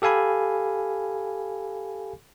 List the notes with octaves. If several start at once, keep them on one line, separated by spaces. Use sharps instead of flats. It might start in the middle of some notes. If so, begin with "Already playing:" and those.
G4 A4 F5 G#5 B5